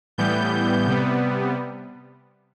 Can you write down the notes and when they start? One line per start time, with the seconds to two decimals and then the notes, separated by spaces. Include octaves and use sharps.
0.18 A2 E3 G3 B3 G6
0.87 C3 G3 B3